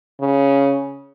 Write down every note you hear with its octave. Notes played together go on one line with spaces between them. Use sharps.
C#3